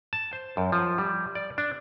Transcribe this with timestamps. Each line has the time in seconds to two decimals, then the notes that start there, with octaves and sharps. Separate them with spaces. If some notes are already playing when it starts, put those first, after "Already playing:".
0.13 A5
0.33 C5
0.57 F#2
0.72 F3
0.98 G3
1.35 D5
1.58 D4